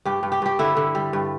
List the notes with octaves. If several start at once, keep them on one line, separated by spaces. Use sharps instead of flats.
G2 G4
G2
G4
G2 G4
D3 E4
D3
G3
G2